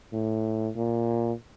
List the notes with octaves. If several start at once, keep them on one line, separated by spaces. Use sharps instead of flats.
A2
A#2